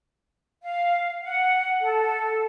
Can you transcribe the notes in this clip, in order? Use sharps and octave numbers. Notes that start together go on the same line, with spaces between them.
F5
F#5
A4